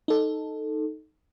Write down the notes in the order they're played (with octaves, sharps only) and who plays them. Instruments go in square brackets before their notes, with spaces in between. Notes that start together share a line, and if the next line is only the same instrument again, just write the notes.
[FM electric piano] D#4 A4